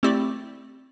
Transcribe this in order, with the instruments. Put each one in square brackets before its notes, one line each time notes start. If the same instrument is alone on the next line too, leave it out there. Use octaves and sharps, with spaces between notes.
[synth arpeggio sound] A3 C4 E4 G4 D5